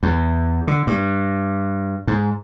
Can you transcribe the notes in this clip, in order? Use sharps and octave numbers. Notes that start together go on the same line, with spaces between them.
E2
D3
G2
G#2